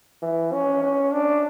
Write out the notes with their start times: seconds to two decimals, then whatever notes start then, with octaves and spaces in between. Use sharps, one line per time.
0.22 E3
0.53 C#4
0.83 C#4
1.13 D4